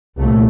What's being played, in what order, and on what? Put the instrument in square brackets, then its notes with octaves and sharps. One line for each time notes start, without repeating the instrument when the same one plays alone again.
[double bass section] C2 A#2 A3